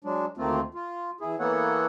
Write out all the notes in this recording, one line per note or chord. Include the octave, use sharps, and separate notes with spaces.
F#3 G#3 D4
D2 D#3 A3 A#3 C4 F4
F4
E2 E4 G#4
E3 A#3 B3 A4 C#5 F#5